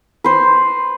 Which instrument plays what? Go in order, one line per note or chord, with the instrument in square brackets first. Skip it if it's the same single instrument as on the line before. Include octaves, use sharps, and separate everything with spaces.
[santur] B4 C5